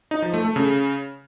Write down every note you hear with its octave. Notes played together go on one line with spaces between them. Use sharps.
D#4
F3
A3
A3
C#3